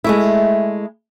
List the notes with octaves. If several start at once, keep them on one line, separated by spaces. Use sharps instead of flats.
G#3 A3 E4